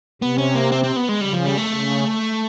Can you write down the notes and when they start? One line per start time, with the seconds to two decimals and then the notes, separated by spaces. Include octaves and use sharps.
0.22 C3 B3
0.38 C#4
0.55 A#3
0.72 C4
0.84 C4
0.96 B3
1.09 G#3
1.21 C#3 G3
1.33 F3
1.46 G3
1.58 A3
1.70 C#3